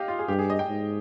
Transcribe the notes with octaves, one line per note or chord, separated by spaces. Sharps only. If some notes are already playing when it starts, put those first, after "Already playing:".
Already playing: G4 D#5 F5
F4
G#4
G2 G4
G#4
D#5
G5
G#2